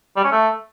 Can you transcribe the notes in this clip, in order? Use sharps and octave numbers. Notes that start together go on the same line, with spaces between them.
G3
C#4
A3